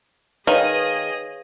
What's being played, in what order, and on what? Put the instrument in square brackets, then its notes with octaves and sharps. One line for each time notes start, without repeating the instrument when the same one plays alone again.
[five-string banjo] D#3 [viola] G#4 D#5 [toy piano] B4 F5 [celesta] C#5